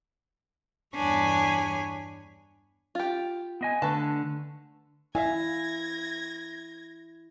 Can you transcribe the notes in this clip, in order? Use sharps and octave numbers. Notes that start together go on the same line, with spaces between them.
E2 G2 D4 C#5 G#5 B5
F4 G4
B3 D#5 G#5
D3 A3 B4 A5
E4 E5 F5 G#5 G#6 A#6